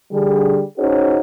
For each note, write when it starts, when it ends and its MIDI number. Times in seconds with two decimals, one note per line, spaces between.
0.11 0.61 50
0.11 0.61 55
0.11 0.61 68
0.77 1.18 61
0.77 1.18 63
0.77 1.18 66
0.77 1.18 68
0.77 1.18 72
0.77 1.18 73